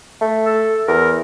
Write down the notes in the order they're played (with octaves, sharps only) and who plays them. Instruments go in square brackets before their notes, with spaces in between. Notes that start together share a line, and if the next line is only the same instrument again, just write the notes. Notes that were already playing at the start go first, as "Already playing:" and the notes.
[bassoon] A3
[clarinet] A4
[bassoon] E2 [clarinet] A#4